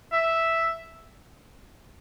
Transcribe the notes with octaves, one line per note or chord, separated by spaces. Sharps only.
E5